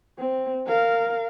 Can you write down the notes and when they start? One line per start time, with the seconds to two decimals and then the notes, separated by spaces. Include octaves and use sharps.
0.18 C4
0.66 A#4 F5